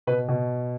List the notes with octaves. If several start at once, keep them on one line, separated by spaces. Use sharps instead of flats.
B2 B4
B2